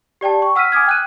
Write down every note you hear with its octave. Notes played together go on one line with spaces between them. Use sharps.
G4 D5 G5 A5
C#6
F#5 E6 F6 B6 D#7
G#5 D6 D#6 F6 G#6
G5 F#6 D#7